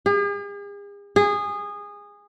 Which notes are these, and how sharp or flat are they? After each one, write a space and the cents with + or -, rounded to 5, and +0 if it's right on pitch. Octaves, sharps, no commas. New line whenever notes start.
G#4 -45
G#4 -20